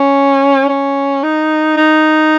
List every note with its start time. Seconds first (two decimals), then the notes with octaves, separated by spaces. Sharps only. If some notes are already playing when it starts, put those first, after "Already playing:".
Already playing: C#4
0.69 C#4
1.23 D#4
1.77 D#4